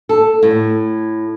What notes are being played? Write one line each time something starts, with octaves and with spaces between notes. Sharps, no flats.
A4
A2